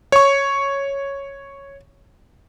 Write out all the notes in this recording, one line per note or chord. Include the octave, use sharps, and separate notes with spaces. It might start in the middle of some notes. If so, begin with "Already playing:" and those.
C#5 C#6